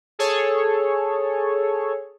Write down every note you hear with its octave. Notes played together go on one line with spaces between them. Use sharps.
G#4 A4 C#5